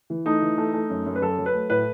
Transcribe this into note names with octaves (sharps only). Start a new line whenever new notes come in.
E3
A3 D#4
E3
A3
A3
F#2
F#2
B4
F#3 A4
F#3
B4
A3
A2 B4